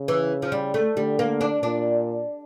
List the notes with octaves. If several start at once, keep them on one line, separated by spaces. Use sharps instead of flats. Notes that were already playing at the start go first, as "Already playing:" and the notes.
Already playing: C#3
E3
F3
G3
A3
D3 G3
A#3
D4
A#2 D4